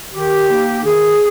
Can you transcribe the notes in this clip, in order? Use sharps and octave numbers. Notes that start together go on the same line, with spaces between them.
D#3 G4
A#3 D#4
D#3 G#4